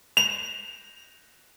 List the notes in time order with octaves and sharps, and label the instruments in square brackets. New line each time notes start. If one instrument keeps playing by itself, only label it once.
[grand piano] F7